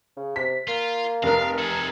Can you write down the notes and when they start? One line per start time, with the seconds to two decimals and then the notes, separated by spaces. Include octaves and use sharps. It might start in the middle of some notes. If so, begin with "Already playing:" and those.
0.16 C#3
0.36 C3 B6
0.68 A#3 F4
1.23 F1 A#4 F5
1.59 G#4 A4